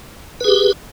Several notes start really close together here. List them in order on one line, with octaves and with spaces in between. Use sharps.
B4 G#4 G4